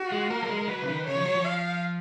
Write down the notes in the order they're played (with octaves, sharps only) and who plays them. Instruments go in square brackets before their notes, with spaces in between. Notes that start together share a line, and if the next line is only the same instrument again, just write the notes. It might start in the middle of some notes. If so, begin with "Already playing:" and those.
Already playing: [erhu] F#4
[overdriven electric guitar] G#3
[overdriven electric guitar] A#3 [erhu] A#4
[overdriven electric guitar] F#3
G#3
G#3
[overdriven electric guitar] F#3 [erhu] B4
[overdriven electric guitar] C#3
D#3
[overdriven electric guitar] C#3 [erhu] C#5
[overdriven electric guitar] F3
F#3
F3
[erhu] F5